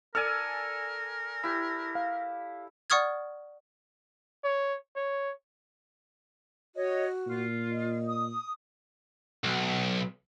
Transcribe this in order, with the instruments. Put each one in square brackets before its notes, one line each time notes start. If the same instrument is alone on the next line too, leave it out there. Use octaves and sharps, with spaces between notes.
[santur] A4 D5 G#5 [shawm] A#4 [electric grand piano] F6
[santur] E4 G4
[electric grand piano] F5
[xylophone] D5 F#5 C#6 D#6 F6 G#6
[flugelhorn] C#5
C#5
[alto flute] F#4 [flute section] C#5 D#5
[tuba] A#2 [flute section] F4
[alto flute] D#5
[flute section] D#6
[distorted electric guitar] B1